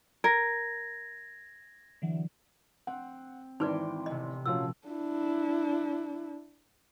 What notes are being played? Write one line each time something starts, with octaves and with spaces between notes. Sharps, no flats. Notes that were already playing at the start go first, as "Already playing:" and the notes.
A#4 G#6 A#6
D3 E3 F#3
C4 F#5
G#1 E3 D#4 B4 D5 G5 C6 D6
A1 C3 D#5
A#2 F3 A3 C#4 F4 F#4 E6
D4 E4